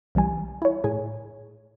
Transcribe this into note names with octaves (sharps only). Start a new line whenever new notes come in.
B1 E3 G3 G#5
E4 C#5
A2 G#4 G#5